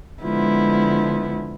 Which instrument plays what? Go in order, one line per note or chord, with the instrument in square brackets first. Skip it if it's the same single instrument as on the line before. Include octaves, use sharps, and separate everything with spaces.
[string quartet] D3 F3 G#3 B3 E4